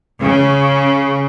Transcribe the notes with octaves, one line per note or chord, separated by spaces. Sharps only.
C#3